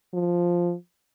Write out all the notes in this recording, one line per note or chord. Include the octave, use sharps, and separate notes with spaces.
F3